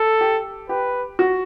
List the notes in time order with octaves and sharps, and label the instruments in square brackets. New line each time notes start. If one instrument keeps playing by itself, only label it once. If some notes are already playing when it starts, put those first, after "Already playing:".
Already playing: [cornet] A4
[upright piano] G4
[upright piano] G4 [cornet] B4
[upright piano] F#4